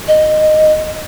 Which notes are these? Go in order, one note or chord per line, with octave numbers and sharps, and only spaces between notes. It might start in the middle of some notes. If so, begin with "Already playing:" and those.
D#5